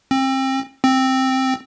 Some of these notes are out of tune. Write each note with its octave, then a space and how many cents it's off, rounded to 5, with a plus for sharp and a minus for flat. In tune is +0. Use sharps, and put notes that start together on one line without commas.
C4 +30
C4 +5